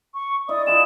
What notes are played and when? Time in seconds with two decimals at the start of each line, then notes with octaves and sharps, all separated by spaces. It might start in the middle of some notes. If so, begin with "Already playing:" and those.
0.14 C#6
0.49 E4 D5 D#5 D#6
0.67 E4 F4 G#4 E7